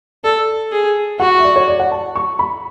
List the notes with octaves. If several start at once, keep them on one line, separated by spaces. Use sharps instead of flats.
A4 D5
G#4
F#4 F#5
E5
D5
C#5
D5
F#5
A5
C#6
B5